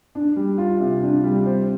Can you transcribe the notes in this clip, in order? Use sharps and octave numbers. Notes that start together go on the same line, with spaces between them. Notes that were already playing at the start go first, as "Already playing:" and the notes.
D4
G3
F4
C3
D4
G3
C4